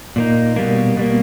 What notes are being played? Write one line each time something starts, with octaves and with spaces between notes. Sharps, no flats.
A#2 A#3 D#4
B2 G3 A#3
B2 G3 A#3